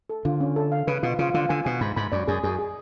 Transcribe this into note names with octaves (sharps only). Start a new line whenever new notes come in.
A4
D3 F4
C#4
A4
F5
C#3 B4
B2 F4
C#3 F4
D3 F4
D3 G#5
B2 G#5
G#2 B5
G#2 B5
F#2 D5
F#2 G#4
F#2 G#4
G#4